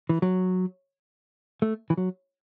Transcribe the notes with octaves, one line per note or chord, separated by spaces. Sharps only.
E3
F#3
A3
E3
F#3